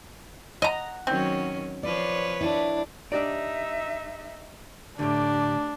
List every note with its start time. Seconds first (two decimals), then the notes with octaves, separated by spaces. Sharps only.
0.62 D#5 F#5 A#5
1.07 D#3 F#3 C4 C#4
1.83 F3 B4 C#5 D5
2.41 D4 E4 E5
3.12 D4 D#4 G4 D5 E5
4.99 A2 D3 A3 D4 G4